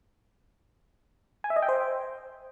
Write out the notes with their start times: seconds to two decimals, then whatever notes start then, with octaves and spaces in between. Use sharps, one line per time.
1.44 G#5
1.50 E5
1.56 D#5
1.62 G5
1.69 C5